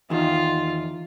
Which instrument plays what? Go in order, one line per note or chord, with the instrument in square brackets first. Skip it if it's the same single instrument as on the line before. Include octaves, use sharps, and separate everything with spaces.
[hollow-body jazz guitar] E2 D#3 [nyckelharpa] F4